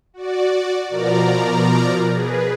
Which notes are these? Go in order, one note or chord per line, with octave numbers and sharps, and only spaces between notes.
F#4 D5
B2 F3 A#4 D5 A#5
G#4 B4